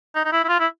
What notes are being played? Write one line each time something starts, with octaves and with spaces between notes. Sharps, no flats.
D#4
D#4
E4
E4
F4
E4